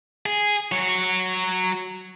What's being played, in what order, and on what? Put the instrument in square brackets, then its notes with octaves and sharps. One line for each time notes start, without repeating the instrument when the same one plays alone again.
[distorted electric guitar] G#4
F#3 C#5